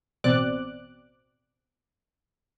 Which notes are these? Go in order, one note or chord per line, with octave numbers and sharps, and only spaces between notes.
A1 B2 C4 D5 D6 F#6